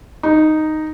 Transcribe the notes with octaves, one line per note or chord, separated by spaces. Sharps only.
D#4